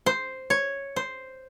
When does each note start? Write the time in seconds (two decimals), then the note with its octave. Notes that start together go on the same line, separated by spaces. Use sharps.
0.06 C5
0.50 C#5
0.96 C5